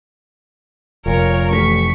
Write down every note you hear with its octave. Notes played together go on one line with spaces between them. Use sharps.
F1 A#2 A#4 C#5
A1 C#6 B6